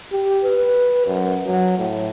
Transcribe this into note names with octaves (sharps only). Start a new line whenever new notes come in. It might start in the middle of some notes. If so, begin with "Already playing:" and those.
G4
B4
F#2
F#3
A2